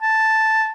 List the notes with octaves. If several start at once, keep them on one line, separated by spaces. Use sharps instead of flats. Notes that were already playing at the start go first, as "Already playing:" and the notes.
A5